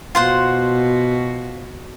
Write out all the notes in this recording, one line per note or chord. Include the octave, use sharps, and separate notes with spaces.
B2 F4 F#4 C5 F#5